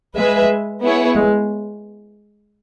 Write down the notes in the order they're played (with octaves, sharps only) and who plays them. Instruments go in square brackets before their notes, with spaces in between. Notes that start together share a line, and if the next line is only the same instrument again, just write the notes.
[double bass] G#3 [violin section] G#4 B4 E5
[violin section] B3 E4 G#4 C#5
[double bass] G#3